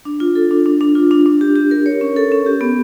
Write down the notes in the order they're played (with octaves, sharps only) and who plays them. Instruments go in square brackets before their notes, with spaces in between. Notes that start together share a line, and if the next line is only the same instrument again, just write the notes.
[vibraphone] D4
F4
A4
D4
D4
D4
F4
D4
D4
G4
G4
A#4
C#5
C#4
A4
C#4
G4
B3